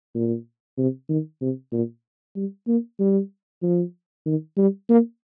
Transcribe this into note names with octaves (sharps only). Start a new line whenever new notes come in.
A#2
C3
D#3
C3
A#2
G3
A#3
G3
F3
D#3
G3
A#3